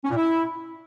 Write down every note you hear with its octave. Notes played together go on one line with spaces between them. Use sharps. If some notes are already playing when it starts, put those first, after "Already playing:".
C#4
A#2
E4